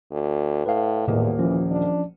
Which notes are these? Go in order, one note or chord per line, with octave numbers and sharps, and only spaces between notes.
D2
A2 B4 F5
D#1 E2 A2 A#3 D#5
E3 F3 C#4
D4